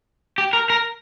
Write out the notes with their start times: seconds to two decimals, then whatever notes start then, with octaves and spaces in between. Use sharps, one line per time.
0.38 G4
0.53 A#4
0.70 A#4